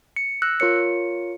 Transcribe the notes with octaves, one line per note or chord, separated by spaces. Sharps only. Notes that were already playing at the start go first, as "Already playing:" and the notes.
C#7
E6 F#6 A#6
F4 A#4 C#5 C#7